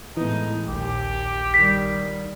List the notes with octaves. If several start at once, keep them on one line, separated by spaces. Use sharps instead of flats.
A2 E3 G#3 B3 D#4
A#1 D#2 G4
D#3 G3 B6